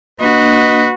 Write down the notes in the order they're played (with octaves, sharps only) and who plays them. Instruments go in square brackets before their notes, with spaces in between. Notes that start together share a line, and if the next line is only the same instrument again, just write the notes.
[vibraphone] A#3 D4 [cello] F#4 [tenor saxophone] B4 [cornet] D#5